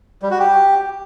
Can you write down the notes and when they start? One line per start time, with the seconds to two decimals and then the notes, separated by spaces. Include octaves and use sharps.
0.22 G3
0.31 F#4
0.39 G4